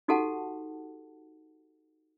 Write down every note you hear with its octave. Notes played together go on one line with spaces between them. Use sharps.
D#4 F#4 G4 A4 F#5 A5